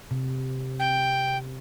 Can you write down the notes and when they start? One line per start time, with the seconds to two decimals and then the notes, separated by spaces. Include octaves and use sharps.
0.11 C3
0.79 G5